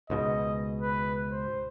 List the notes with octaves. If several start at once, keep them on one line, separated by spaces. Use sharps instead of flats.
C#2 G#2 B2 D#5
B4
C5